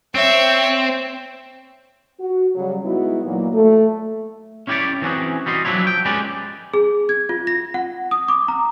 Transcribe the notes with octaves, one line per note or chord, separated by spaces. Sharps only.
C4 C#5 E5
F#4
C#3 F#3 G3 F#4
G#3 B3 D#4 E4 F#4
A#2 E3 F#3 A#3
A3
C#4 E4 G4 A#4 C#5 D5
E3 C4 C#4 F#4 G#4
G3 F#4 D#5 C6
F3 F#3 C#4 D4 E4 C#5
G5
G#3 C#4 G4 B4 D5
G#4
G#6
F4
A#6
F#5
D#6
D6
A#5